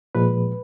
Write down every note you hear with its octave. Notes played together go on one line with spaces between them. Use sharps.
A#2 F3 G#3 B4